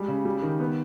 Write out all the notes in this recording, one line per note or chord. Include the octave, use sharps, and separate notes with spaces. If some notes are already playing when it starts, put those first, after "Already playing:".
Already playing: G3 G#3
C#3
G3
D#3
B3